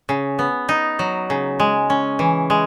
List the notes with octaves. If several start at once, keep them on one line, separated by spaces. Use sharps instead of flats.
C#3
B3
D#4
F#3
C#3
G#3
C#4
E3
G#3